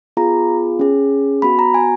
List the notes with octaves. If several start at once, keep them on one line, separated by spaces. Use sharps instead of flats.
B3 F4 G#4 A#5
C#4 G#4
B3 F#4 B5
A#5
G#5